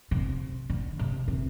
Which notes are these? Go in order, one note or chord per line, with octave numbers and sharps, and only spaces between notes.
C3
D3
C3
C3